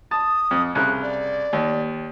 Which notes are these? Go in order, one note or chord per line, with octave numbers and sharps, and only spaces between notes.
A5 D#6
F2
C2 C#3 F#6
D5
D#2